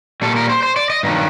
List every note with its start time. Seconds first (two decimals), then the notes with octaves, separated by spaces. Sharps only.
0.22 A#2 G3 A4
0.36 A#4
0.49 C5
0.63 C5
0.76 D5
0.90 D#5
1.03 G2 D#3 F#3